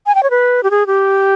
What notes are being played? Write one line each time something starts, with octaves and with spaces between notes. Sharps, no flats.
G#5
G5
C#5
B4
G4
G#4
G4